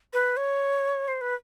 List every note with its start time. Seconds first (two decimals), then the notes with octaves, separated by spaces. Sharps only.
0.13 B4
0.37 C#5
1.08 C5
1.21 B4